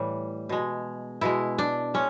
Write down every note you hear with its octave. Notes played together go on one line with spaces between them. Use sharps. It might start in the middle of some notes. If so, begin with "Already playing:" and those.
Already playing: A2 E3 G3
B2 G#3
B2 G#3 E4
D4
G#3 C#4